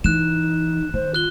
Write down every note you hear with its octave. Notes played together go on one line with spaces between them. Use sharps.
E3 D#4 F#6 E7
D#3 C5
F4 F#6 G7